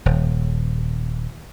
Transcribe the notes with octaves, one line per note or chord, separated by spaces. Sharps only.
D#1